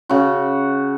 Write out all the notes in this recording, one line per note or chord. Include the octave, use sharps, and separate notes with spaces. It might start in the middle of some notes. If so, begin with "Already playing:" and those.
C#3 F#4